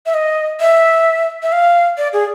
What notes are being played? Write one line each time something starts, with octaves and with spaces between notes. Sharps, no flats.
E5
D#5
E5
E5
F5
D5
G#4